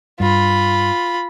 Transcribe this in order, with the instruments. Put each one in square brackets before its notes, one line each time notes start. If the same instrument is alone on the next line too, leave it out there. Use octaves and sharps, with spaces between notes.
[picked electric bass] G2 [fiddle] F4 B5